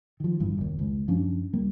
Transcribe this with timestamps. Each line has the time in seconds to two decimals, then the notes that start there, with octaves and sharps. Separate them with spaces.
0.20 D#3 F3
0.40 D1 G1 G2 E3
0.58 F1 D#2
0.79 C#2
1.08 F#2 F3 C#4 D4
1.53 C#2 G3 A#3